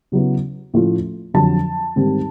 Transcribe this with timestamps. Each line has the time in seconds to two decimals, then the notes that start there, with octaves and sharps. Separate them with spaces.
0.12 C#3 F#3 B3 E4
0.74 A2 F3 A3 C#4 F4
1.34 F2 D3 F#3 A5
1.96 G#2 D#3 G3 C4